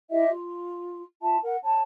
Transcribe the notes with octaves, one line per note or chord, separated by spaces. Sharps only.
E4 G4 D#5 E5
F4
F4 E5 A5
A#4 F#5
C#5 A5